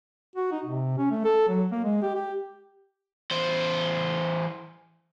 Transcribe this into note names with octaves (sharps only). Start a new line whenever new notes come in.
F#4
D#4
C3
C#4
A3
A4
F#3
A#3
G#3
G4
G4
E2 C5